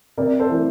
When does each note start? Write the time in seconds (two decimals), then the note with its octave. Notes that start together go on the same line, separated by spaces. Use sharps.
0.18 C3 A#4 D5
0.40 A4 C5
0.50 E3 A3